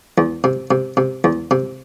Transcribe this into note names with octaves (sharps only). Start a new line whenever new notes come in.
E2
C3
C3
C3
E2
C3